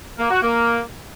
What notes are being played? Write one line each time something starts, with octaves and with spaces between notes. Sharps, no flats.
A#3
F#4
A#3